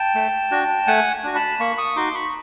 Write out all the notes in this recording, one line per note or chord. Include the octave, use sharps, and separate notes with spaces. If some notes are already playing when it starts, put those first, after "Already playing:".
Already playing: G5 A5
A3
D4 F#4
A3 F#5 G#5
D4 F#4
A5 B5
A#3 B5 C#6
C#6 D#6
D#4 F#4 C6 D6
B5 C#6